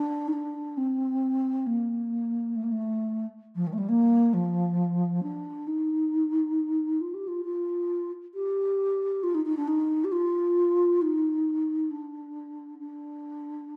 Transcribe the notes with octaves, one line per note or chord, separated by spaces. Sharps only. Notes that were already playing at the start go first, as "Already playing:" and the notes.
Already playing: D4
D#4
D4
C4
A#3
A3
A#3
A3
F3
D#3
A3
G3
A#3
F3
D4
D#4
F4
G4
F4
F4
G4
F4
D#4
D#4
D4
D#4
G4
F4
D#4
D4
D4